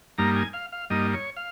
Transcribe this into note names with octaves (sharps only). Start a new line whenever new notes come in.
G2 G3 A#3 D#4 A#5
G#5
F5
F5
G2 G3 A#3 D#4 D#5
C#5
F5